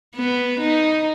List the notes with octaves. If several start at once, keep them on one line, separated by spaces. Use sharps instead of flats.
B3
D#4